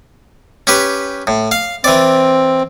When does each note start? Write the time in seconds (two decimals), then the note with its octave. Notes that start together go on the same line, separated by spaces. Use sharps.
0.67 C#4 G4 B4
1.27 A2
1.51 F5
1.84 E3 C4 D5